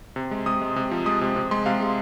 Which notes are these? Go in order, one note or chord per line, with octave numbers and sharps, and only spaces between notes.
C3
G#3
C3 D#6
G#3
C3
F3
G#3 D#6
C3
C3
G#3 C6
C3 F5
G#3